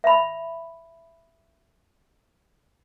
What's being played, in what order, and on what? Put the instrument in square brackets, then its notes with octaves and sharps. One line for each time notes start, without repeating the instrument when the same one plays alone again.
[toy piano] E5 B5